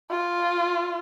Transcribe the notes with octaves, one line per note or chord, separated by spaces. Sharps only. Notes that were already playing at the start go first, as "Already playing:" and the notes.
F4